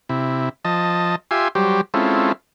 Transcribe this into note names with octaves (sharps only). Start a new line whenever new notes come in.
C3 E4
F3 D#5 A5
F4 G4 E5 G#5 C6
F#3 G3 G4 C5
G#3 C4 C#4 E4 F4 A4